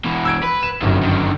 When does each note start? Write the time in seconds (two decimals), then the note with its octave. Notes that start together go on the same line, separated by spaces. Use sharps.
0.05 B2 E3
0.25 E6 G#6 D7
0.44 B4
0.63 E7
0.82 G1 F#2 C3 D#3
1.03 D3 D#3